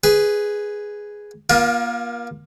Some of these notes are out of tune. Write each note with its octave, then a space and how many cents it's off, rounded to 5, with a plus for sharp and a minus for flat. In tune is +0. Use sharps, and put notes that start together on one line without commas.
G#4 +0 B4 +0
A#3 +35 F4 +0 A#4 +30